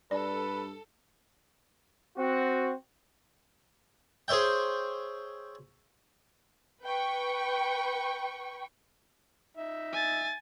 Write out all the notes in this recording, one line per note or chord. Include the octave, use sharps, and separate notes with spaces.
G2 A4 B4 D5
C4 F#4
G#4 C5 C#5 E5 G5
B4 G5 C#6
D#4 E5
G#5 A6